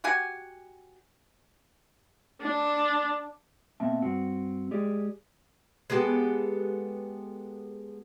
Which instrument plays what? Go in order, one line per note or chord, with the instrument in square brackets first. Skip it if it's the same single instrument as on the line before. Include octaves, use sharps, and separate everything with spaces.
[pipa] F#4 G4 F#5 G#5
[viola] D4
[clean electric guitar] B2 A#3 C4 E5 A5
G2 C4 F#4
G#3 G4 G#4 D5
[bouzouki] G#3 B3 G4 A4